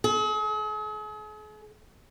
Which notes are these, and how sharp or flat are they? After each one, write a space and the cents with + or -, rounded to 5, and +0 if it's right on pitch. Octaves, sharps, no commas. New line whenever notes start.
G#4 +45